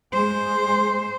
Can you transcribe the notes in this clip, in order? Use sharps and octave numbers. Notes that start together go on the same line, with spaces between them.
G#3 C5